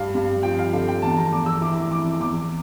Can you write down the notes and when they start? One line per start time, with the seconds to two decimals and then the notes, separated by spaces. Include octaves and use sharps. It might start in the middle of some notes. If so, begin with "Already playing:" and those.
Already playing: G2 F5
0.14 G2
0.43 F3 G5
0.59 F5
0.73 D3 F5
0.88 G5
1.02 E2 A5
1.17 A#5
1.32 E2 D6
1.46 E6
1.61 E3 D6
1.91 E3 D6
2.20 E2 D6